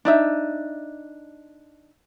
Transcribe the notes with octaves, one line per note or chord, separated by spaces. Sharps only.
D4 D#4 E5